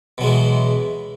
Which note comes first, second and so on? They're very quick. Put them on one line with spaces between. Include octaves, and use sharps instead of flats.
B2 F#3 G#3 E3